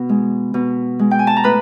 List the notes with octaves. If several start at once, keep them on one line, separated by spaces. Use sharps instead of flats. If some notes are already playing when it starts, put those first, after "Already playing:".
Already playing: B2 B3
G#3
B2
G#3
G5
G#5
A5
A#5
A2 B4 B5